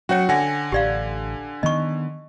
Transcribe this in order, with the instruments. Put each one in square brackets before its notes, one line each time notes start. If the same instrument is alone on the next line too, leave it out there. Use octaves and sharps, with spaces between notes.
[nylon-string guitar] F#3 [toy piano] C#4 C#5 [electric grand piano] F#4 F#5 C#7
[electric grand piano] D3 G#5 A#6 [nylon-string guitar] F#5
[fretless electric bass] A1 [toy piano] G4 D5 F5
[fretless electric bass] D#3 B3 [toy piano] D#5 C#6